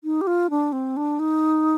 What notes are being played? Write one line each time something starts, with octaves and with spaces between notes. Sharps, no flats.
D#4
G4
F4
D4
C4
D4
D#4